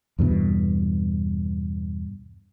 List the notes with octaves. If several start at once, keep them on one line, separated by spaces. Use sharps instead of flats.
E2 G2 B2